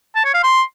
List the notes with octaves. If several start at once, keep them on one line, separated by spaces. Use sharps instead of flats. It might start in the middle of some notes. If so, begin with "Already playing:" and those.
A5
C#5
F5
C6